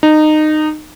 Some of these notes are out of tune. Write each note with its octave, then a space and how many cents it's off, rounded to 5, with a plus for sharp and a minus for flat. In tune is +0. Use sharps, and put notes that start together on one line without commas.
D#4 -20